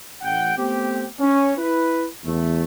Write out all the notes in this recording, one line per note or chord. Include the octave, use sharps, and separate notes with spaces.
A1 F#5 G5
A3 B3 C4 G4
C#4
E4 B4
E2 A3